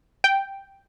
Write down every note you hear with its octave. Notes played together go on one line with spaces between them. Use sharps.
G5